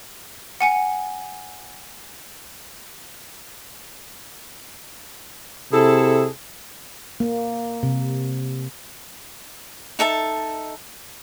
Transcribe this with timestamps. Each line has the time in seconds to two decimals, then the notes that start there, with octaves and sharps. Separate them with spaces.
0.60 F#5 G#5 C#7
5.72 C3 E4 G#4 A4
7.20 A#3
7.83 C3
9.99 D#4 A4 E5 A5